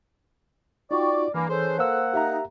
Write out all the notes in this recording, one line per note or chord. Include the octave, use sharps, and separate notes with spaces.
D#4 F4 F#4 D5 G5 C#6 D6
G2 E3 A#3 G#5 B5 D6
C#4 G#4 A4 B4 C5
A#3 C5 F#5 E6
D#4 G4 E5 A#5